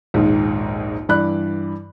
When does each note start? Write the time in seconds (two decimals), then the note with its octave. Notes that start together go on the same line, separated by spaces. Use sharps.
0.14 A#1 D#2 G#2
1.09 G2 E3 D5 B5 F#6